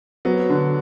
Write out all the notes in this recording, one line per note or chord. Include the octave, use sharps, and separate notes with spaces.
F#3 B3
D3